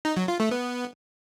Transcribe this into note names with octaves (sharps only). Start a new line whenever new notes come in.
D#4
F#3
F4
A3
B3